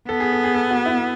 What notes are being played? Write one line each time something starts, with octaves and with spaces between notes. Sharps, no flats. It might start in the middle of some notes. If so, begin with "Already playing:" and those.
B3 A4
G#4
A4
G#4
A4
F#4
E4